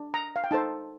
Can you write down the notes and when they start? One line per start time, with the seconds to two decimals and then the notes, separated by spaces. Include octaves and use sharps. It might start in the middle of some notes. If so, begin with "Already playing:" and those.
Already playing: D4
0.14 A#5
0.36 F5
0.44 G5
0.51 D#4 A4 C5 A5